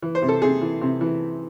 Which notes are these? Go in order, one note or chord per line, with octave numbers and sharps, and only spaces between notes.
E3
C5
C3
A4
C3 G#4
E3
C3
E3